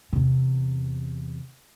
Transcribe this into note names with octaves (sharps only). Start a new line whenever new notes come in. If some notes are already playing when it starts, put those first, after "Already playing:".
E2 C3